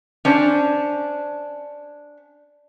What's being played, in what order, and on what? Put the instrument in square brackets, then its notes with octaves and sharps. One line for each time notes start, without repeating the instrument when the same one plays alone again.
[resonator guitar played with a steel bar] C#4 D4 C5